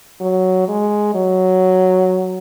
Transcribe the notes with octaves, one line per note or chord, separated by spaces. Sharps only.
F#3
G#3
F#3